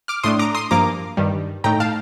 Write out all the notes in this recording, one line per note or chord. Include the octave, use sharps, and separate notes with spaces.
D6 F6
A2 A3 D4 C6 D#6
A#5 D6
C6 D#6
G2 F3 A#3 A#5 D6
G2 D#3 G3
A2 A3 D#4 G5 A#5
F5 A5